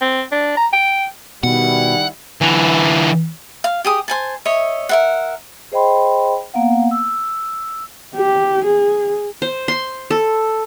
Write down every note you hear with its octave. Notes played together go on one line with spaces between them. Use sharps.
C4
D4
A#5
G5
B2 D#3 G3 E4 F#5
D3 E3
F5
G4 G#4 D#6
C5 G#5 A5
C#5 D#5 E5
A#4 E5 F#5
G#4 C5 D#5 G5 B5 C6
A#3 B3 F5 F#5
E6
G4
G#4
C5
C6
A4